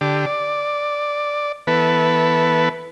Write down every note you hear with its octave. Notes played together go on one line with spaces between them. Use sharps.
D3 G4
D5
E3 B3 A4 B4